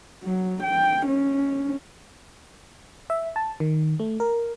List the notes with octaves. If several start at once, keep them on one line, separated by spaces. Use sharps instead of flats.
F#3
G5
C#4
E5
A5
D#3
A3
A#4